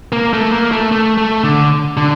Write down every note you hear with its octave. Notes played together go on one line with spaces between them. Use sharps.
A#3
A3
A#3
A3
A3
A3
D3
D3